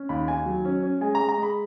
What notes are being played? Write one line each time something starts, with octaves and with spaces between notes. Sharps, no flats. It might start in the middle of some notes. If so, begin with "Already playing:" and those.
Already playing: C#4
D#2 B5
D#3 G#5
F#3
C#4
C#4
G#3 G#5
A#5
G#3
A#5
G#3 B5